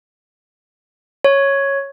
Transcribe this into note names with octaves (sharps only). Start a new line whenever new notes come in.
C#5